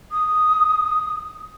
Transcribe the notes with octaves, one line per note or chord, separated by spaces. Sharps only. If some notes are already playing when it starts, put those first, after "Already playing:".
D#6